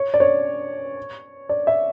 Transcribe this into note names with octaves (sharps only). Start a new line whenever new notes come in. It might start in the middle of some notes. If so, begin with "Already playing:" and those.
Already playing: C#5
D5
C#5
D5
E5